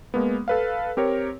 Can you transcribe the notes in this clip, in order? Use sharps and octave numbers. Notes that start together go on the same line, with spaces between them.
G#3 A#3 B3
A4 B4 F5
C4 G4 A#4 C#5